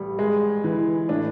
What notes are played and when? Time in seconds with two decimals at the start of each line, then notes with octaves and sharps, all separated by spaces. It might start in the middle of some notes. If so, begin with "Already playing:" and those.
Already playing: A1 G3
0.19 G#3
0.64 E3
1.09 A2 D4